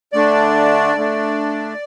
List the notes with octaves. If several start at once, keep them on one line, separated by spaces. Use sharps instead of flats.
D3 A3 D4 D5
D3 A3 D4